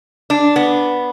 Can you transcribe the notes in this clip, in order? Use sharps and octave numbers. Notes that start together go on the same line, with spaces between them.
D4
B3